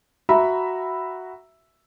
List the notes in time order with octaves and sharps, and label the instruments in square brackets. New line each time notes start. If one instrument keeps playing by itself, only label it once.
[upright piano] F#4 E5 A#5 B5